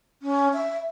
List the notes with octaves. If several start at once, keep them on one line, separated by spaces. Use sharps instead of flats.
C#4
E5